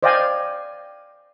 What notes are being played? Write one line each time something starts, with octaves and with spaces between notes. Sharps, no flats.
C5 D5 D#5 F5 G5 G#5